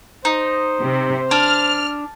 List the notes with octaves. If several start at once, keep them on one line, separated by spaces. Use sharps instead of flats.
D#4 C5
C3
D4 F6